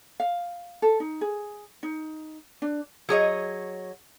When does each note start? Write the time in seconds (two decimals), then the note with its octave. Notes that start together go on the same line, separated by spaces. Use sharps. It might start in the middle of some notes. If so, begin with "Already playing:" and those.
0.20 F5
0.82 A4
1.00 D#4
1.21 G#4
1.83 D#4
2.62 D4
3.09 F#3 G#4 C#5 D#5